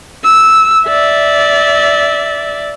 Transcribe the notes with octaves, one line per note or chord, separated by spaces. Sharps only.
E6
D5 E5